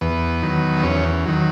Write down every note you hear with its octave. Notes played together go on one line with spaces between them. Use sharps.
E2 B3
D#3 F#3
E2 C#4
D#3 F#3